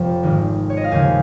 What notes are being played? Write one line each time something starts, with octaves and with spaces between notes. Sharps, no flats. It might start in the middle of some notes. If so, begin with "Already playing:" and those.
Already playing: F1 F2 F3
G#1 G#2 D#3 G#3
C#5
D#5
F5
D#2 C#3 F3 G#5